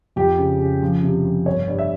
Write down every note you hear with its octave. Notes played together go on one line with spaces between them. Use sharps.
F2 G4
C#3
C#3
F3
C3
F3
G1 C#5
G2
E5